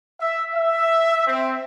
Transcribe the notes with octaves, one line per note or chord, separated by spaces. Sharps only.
E5
E5
C4